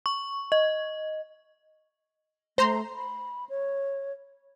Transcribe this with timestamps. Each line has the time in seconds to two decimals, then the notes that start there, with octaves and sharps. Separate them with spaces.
0.06 C#6
0.52 D#5
2.58 A3 C5 A#5 C6
2.94 B5
3.49 C#5